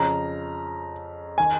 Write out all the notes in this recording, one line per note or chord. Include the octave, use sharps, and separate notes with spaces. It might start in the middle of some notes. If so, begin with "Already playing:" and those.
Already playing: F2 C#3 A#5
D#3 G#5